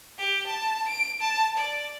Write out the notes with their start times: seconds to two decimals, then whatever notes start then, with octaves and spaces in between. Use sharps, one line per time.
0.18 G4
0.48 A5
0.88 D7
1.21 A5
1.57 D5